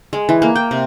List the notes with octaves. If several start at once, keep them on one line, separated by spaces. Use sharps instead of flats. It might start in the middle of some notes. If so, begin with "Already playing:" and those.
G#3
E3
A#3
G5
C3